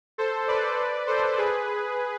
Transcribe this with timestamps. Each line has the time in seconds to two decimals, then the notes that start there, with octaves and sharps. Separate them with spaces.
0.18 A4 C5
0.48 B4 D5
1.07 A4 C5
1.37 G#4 B4